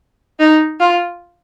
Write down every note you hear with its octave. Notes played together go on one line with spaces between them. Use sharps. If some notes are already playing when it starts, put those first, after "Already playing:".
D#4
F4